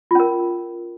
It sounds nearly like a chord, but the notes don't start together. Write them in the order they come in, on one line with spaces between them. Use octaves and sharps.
F4 C#4 A#4